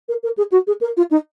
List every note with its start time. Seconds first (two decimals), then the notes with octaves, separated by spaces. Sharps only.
0.08 A#4
0.23 A#4
0.37 G#4
0.51 F#4
0.67 G#4
0.81 A#4
0.97 F4
1.10 D#4